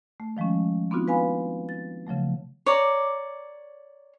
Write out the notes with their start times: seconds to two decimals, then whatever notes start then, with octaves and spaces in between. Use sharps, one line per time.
0.20 A3
0.37 D#3 F3 G#3 A3 C#4
0.91 B3 C4 D4 D#4 F4 F#4
1.08 B4 F5 G#5 B5
1.69 A6
2.07 C#3 F3 F#3 A3
2.66 C#5 D5 A#5